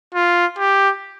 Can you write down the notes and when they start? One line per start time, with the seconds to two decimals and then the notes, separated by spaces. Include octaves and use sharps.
0.15 F4
0.59 G4